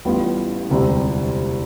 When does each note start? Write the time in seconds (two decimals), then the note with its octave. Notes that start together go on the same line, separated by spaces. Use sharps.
0.05 A1 A2 G3 B3 F4
0.70 E1 D2 C3 G3 D4